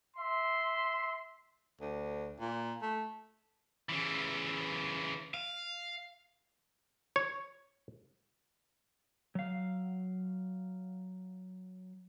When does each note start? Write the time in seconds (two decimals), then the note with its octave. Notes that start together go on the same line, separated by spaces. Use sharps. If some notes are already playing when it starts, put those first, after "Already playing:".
0.16 E5 C6
1.80 D2
2.40 A#2
2.82 A3
3.89 C#3 E3
5.34 F5
7.16 C#5
9.35 F#3 F5